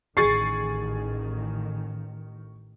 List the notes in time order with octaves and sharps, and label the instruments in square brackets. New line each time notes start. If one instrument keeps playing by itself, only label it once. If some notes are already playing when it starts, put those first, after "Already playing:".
[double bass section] A1 D#3 [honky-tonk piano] G#4 A6 C7 [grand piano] C#6